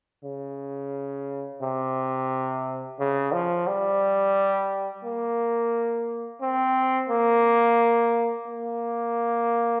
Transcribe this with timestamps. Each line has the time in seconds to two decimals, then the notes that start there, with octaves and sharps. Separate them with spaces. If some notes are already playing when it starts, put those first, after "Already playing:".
0.24 C#3
1.62 C3
2.99 C#3
3.33 F3
3.67 G3
5.04 A#3
6.42 C4
7.09 A#3
8.47 A#3